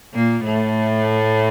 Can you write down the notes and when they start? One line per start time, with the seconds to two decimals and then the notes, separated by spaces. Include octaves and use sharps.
0.14 A#2 A#3
0.44 A2 A3